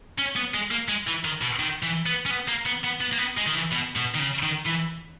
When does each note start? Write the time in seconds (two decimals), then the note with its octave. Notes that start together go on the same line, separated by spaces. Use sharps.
0.19 C#4
0.36 B3
0.54 G#3
0.71 A#3
0.88 G#3
1.07 E3
1.24 D#3
1.41 B2
1.59 D#3
1.83 E3
2.06 B3
2.26 C#4
2.31 B3
2.48 A#3
2.66 B3
2.84 B3
3.01 B3
3.12 A#3
3.18 B3
3.37 G#3
3.46 D#3
3.54 E3
3.71 B2
3.96 B2
4.14 D#3
4.19 C#3
4.43 D#3
4.66 E3